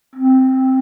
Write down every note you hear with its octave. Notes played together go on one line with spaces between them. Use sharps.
C4